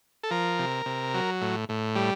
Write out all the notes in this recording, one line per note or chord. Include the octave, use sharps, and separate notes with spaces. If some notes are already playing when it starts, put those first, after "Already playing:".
A4
F3 A#4
C3
C3
F#3
A2
A2
G3